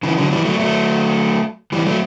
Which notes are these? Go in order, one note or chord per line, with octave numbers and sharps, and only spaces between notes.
C#3 E3
D3 F#3
E3 G3
F#3 A3
F#3 A3
E3 G3
F#3 A3